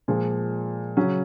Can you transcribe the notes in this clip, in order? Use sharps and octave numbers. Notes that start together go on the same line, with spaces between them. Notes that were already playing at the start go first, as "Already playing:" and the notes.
A#2 F3 G#3
C#3 F#3 C#4